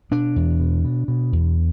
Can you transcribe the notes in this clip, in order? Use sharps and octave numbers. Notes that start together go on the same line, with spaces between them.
B2 D4
E2
B2
B2
B2
E2